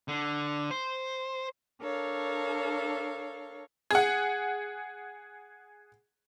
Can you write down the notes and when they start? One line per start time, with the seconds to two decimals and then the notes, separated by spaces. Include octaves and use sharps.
0.08 D3
0.71 C5
1.81 D4 A4 A#4 C#5 F5
3.91 G#4 F#5